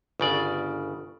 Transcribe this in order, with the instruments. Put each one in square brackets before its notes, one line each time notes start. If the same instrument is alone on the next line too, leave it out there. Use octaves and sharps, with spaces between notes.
[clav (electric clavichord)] G1 C#3 D5